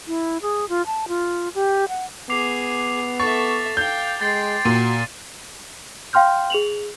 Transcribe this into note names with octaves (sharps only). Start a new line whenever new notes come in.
E4
G#4
F4
A5
F4
G4
F#5
B3 G#4 D6 C7 F7
A4 E5 C#6 A6
F5 G5 G6
G#3 G5 C6 A6 C7
A#2 F#4 D#7
F5 G5 C6 F6 G6
G#4 F7 F#7